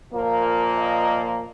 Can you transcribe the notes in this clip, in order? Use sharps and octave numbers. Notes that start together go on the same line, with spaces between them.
A#2 F3 A#3
D#5